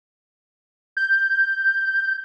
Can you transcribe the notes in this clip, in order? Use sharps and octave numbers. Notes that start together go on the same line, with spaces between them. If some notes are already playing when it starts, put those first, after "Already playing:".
G6